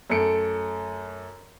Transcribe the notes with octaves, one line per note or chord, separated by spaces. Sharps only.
F#2 A3 A4 C#7 D7